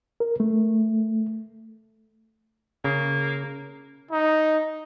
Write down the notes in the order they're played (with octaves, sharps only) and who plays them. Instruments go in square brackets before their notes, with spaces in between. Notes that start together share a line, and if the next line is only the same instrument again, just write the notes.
[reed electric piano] A#4
A3
[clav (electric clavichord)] C#3 [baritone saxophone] A#3
[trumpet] D#4